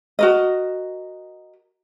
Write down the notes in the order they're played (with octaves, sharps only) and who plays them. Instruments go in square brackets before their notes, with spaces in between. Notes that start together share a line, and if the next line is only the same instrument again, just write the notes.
[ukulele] F#4 A#4 D#5